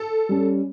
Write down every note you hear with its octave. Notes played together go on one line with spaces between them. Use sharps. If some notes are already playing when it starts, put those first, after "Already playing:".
Already playing: A4
G3 C#4